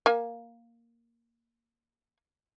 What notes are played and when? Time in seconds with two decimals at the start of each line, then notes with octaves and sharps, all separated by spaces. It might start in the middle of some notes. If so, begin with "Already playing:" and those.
0.06 A#3 G#5